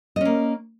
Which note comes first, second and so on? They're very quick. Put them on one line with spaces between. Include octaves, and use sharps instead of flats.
D#5 C#4 A#3